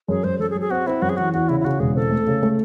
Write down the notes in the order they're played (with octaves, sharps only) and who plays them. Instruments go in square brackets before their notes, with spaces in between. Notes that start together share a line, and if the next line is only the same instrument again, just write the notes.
[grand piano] F#2 [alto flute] G#4
[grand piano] F#2 [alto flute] C5
[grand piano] F#2 [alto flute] A4
[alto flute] G#4
[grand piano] F#3
[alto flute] G#4
[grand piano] C4 [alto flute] F#4
[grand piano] C4 [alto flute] E4
[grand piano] F#2 [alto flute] F#4
[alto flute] G#4
[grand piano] E3 [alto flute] F#4
[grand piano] E2 [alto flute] F#4
[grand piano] C#3 [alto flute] E4
[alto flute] E4
[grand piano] C#3 [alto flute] F#4
[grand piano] E1 [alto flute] G#4
[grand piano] C4 [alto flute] A4
[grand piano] A3
C#3
A3